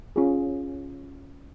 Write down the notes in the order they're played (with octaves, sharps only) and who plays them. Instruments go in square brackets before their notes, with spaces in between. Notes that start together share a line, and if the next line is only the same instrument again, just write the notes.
[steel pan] C#4 F4 G#4